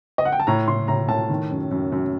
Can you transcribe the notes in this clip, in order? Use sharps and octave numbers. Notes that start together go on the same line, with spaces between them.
D#5
F#5
G5
A5
A2 A#5
A2 C6
A2 A#5
A2 A5
D#3
F#2
F#2
F#2